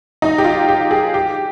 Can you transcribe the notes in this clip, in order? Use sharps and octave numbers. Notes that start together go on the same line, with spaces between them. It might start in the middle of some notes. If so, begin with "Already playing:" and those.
D#4
G4
F4
G4
G#4
G4